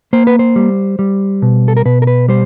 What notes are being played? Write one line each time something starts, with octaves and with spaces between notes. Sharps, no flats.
A#3 C5
B4
C5
G3
G3
B2
A4
A#4
B2 B4
A#4
B4
G3 C5